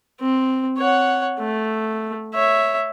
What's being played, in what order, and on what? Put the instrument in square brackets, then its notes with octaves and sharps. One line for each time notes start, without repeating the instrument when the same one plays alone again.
[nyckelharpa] C4
C#5 F#5
A3
C#5 E5